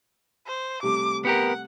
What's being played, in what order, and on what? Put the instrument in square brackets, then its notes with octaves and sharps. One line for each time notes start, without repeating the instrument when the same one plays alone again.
[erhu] C5
[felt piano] C3 G3 A3 [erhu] D6
[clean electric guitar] B3 G4 A#4 [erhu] F#5